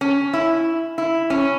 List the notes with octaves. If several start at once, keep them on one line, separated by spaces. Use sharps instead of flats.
C#4
E4
E4
C#4